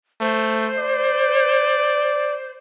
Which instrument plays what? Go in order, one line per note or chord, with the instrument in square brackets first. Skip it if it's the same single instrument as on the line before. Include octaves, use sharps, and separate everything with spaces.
[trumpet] A3 [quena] C5
[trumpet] D5